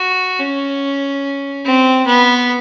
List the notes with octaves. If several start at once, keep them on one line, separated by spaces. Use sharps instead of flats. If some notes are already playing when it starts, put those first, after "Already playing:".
Already playing: F#4
C#4
C4
B3